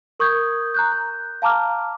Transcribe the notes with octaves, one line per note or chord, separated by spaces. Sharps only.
A#4 C#6 D#6 G6 G#6
A#5 F#6 G6
G6
F5 A5 A#5 D6 F6